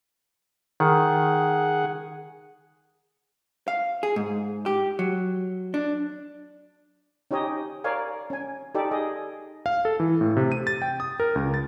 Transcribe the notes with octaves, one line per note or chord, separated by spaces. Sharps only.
D#3 G#4 F#5
F5
G#4
G#2
G4
F#3
D4
C#4 D#4 G4 C#5 D#5
A#4 C#5 D5 F5 G#5
C#4 G#5
D#4 G4 A4 D5
G#4 D#5
F5
A4
E3
A2
C3
D#7
A6
G5
D#6
A#4
C#2
A6